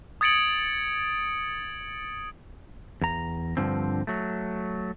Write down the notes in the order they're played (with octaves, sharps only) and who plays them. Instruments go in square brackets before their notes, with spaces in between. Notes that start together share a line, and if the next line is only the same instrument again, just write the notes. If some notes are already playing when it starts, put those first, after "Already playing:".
[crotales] D#6 G#6 A6 C#7 D7 F#7
[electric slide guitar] E2 A#5
G2 D3 F3 C4
F#3 A3